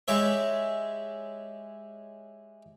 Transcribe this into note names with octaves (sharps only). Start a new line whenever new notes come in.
G#3 G4 C#5 E5